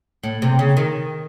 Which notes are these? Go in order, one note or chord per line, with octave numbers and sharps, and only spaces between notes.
A2
C3
C#3
D#3